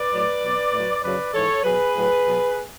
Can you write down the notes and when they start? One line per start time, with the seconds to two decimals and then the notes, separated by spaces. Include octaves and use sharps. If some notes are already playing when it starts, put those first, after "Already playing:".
Already playing: B4 D5
0.12 A2 F#3
0.42 B2 F#3
0.73 A2 F#3
1.03 F#2 C#3 F#3 B4 D5
1.34 G#2 E3 A4 C#5
1.64 B2 F#3 G#4 B4
1.95 A2 F#3
2.26 B2 F#3